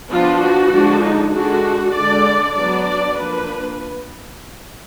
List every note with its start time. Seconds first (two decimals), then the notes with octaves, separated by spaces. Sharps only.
0.10 F3 B3 D4 F4
0.41 F#4
0.71 D3 F3 G#3 D4
1.02 D#4
1.32 D3 G#3 D4 F#4
1.93 D3 G#3 D4 D5
2.55 F#3 B3 D4 D5
2.85 D5
3.16 F3 A#3 D4 B4